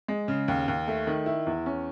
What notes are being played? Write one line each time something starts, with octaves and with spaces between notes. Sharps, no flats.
G#3
C#3
D#2
D#2
A3
D#3
E4
E2
C#4